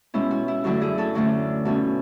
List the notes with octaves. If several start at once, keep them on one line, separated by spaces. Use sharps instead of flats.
B2 G#3 C#4 E4
F#4
E4
F#2 D3 F#3 A3 F#4
E4 G#4
F#4 A4
D2 D3 A3 C#4 F#4
B2 A3 C#4 F#4